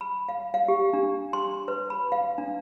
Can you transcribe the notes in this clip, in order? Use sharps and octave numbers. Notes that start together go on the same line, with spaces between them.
B5
F5
F5
G4
D4
C6
B4
B5
F5
D4